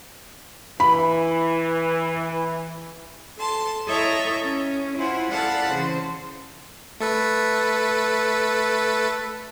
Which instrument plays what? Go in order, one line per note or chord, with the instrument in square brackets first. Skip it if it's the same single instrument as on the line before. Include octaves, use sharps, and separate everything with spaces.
[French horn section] E3 [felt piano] B5
[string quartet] A4 A5 C6
E4 A4 C#5 D#5 E5 A#5
C#4
E4 F4 C5 F#5 G#5
A4 D5 F5 F#5 A5 B5
C#3 E3 C5
[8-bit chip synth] A3 A4 B4